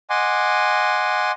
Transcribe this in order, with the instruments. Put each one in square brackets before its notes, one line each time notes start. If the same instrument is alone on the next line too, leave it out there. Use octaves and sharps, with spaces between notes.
[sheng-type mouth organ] D#5 F#5 G#5 C6 D6